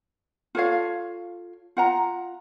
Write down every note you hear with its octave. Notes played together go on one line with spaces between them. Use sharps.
F4 A4 C#5 F5
F4 F#5 A#5